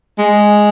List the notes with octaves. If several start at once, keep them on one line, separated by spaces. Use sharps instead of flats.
G#3